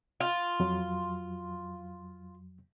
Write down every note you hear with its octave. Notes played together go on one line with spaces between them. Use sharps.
F4
F2 F#3